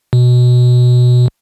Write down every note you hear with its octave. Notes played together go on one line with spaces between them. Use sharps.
B2